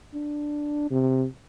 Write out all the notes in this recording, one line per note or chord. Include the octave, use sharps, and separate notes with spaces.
D4
C3